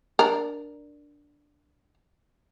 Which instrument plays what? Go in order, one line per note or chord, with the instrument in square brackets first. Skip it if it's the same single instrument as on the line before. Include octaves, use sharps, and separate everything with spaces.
[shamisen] D4 A#4